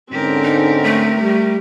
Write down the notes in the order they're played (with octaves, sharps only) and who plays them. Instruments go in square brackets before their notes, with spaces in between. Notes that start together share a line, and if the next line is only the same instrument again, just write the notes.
[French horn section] G#2 D3 C#4 [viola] C4 [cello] G4 A#4
[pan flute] D#4
A3
[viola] G3